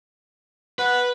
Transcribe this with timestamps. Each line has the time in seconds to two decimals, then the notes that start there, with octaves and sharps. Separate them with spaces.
0.79 B4 F#5